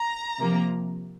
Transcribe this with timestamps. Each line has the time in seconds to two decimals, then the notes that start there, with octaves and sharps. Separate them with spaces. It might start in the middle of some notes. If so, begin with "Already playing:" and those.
Already playing: A#5
0.38 C3 F3 A#3